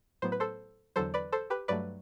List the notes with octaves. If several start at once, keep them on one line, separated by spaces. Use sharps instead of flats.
A2 F#3 B3 C5
B4
A4 C5
E2 D3 F#3 A4 C5
B4 D5
A4 C5
G4 B4
G2 F#3 A3 B4 D5